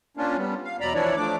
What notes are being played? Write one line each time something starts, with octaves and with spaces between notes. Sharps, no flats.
A#3 C#4 D4 F4
G3 B3
F5
E2 B2 F#3 D5 A#5 B5
E3 F3 D4 E4 C#5 D5
F3 A3 D4 D6